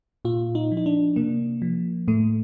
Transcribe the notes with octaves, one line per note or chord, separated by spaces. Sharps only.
A#2 F4
D#4
F3
D#4
D4
C3 A#3
F3
A2 A3